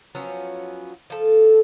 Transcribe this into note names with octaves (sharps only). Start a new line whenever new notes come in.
F3 F#3 B3 C#4
F3 A4